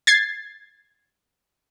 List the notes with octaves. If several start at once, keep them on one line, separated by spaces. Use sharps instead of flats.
G#6 A6 C7